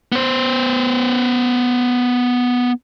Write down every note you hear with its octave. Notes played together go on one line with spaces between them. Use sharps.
B3 C5